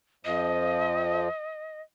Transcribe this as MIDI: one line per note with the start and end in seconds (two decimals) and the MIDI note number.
0.25 1.28 41
0.25 1.28 53
0.25 1.82 75